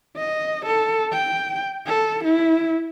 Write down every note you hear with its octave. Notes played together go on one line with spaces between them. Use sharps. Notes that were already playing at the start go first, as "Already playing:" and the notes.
D#5
A4
G5
A4
E4